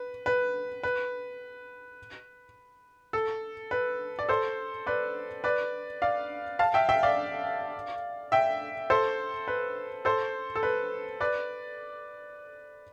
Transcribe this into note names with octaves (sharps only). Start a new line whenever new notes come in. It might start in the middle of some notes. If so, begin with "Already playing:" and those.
Already playing: B4
B4
B4
A4
B4
D5
A4 C5
B4 D5
B4 D5
D5 F5
F5 A5
E5 G5
E5 G5
D5 F5
E5 G5
A4 C5
B4
A4 C5
A4
B4
B4 D5